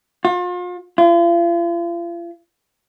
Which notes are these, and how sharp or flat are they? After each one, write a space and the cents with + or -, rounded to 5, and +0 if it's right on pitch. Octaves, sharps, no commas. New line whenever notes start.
F4 +40
F4 -40